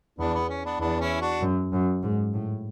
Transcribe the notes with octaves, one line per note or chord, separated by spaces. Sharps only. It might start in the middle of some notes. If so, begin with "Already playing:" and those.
E2 B3 D4
B3
C#4
B3 D4
E2 B3 D4
C#4 E4
D4 F#4
F#2
F#2
G#2
A2